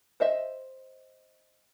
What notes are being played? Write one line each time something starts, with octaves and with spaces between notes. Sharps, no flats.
C5 D#5 E5